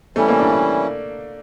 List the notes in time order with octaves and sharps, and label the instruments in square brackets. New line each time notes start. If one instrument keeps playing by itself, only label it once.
[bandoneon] E3 G3 C#4 E4 [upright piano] A3
[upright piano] A#3
D4
D4